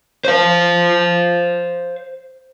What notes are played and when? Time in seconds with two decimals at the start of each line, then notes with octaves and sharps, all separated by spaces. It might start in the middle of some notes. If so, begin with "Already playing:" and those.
0.25 C5 F5